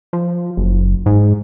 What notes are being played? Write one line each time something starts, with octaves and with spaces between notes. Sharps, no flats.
F3
F#1
G#2